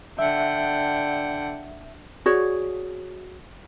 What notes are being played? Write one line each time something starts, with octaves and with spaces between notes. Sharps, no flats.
D3 E5 F#5 G5
F#4 G#4 C#5 D5